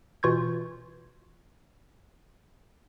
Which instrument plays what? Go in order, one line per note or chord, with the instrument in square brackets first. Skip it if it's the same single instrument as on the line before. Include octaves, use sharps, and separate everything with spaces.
[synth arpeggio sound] B2 E3 F4 C#6 G6 G#6